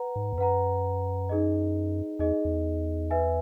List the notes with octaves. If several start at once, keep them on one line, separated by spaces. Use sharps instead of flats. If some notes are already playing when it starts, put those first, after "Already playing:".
Already playing: B4 F#5 A#5
G#2
E2
F#2 B4 F#5 A#5
D#4 G#4 D#5
E2 D#4 G#4 D#5
E2
B4 E5 G#5